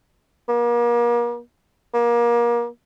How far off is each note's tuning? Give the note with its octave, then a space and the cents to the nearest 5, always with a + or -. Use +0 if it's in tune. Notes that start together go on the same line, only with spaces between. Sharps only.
A#3 +40
A#3 +30